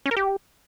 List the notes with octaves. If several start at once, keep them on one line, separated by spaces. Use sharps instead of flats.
C#4
A#4
G4